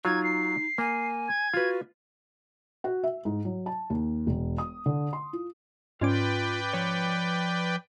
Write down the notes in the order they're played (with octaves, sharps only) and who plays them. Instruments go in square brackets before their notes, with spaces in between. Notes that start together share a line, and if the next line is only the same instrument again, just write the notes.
[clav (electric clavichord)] F#3 F4 [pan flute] D#4 [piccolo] G#6
[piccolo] C7
[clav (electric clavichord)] A#3 [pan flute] G#5
[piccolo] G#6
[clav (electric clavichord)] F4 B4 [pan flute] F#4
[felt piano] F#4
E5
G#2
F#3
A5
D#2
E1
D#6
D3
C6
F4
[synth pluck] G#2 C#4 D6 [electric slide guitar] F4 [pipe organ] B4 D5 G5
[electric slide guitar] F3 C#5